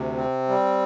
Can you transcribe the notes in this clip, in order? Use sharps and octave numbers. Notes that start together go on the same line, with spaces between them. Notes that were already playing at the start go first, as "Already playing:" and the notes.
Already playing: D2 C3
C4
G3